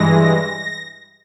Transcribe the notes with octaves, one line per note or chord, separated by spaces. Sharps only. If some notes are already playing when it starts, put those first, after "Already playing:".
Already playing: G2 E3 G#3 A#6